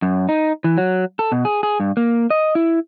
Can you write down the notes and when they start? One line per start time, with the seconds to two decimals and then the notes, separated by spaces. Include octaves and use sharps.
0.02 F#2
0.29 D#4
0.64 E3
0.78 F#3
1.19 A4
1.32 B2
1.45 G#4
1.63 G#4
1.80 G2
1.97 A#3
2.30 D#5
2.55 E4